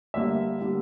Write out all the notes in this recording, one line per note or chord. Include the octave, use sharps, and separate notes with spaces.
G1 G2 D3 G3 A#3 E5
D3 G3 A#3